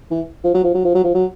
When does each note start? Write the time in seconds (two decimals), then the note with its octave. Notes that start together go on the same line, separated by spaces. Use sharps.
0.11 E3
0.44 F3
0.54 F#3
0.64 F3
0.74 F#3
0.84 F3
0.94 F#3
1.04 F3
1.15 F#3